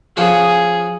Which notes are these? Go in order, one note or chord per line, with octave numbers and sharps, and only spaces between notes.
F3 C#4 F#4 G#4